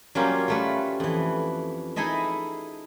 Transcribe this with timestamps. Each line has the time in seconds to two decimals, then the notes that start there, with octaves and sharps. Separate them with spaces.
0.15 F#3 G3 A#3 C#4 F4 G4
0.48 G3 A3 B4
1.00 F2 E3
1.96 D#4 E4 G#4 A4 D#5 E5